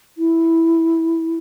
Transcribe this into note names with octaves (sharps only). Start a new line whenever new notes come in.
E4